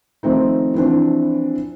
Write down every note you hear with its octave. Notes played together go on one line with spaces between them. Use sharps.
D#3 F3 A3 C4 D#4
E3 F3 C4 D4